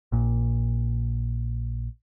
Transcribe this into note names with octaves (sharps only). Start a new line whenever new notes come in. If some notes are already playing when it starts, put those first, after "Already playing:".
A#1 A#2